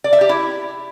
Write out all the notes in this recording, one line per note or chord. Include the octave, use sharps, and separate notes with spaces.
D5
E5
G4
E4